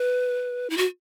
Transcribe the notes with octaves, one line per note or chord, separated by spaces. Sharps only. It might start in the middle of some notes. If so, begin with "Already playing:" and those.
Already playing: B4
E4
F#4